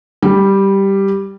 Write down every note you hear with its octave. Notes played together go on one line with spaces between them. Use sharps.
G3